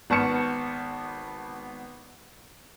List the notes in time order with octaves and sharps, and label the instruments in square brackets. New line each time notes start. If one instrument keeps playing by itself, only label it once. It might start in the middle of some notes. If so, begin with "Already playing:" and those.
[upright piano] G#1 B3 A5 C#6 F6 C#7